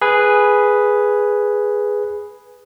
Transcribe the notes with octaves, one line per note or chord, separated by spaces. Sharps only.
G#4 B4